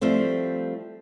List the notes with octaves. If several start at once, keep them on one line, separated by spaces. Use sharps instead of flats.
F3 G3 A3 C4